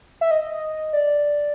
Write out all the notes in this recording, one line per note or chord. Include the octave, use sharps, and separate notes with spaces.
E5
D#5
D5